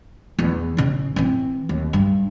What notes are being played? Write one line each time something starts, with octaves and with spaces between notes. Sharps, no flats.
E2
A1 C#3
E3 C4
D#2
G2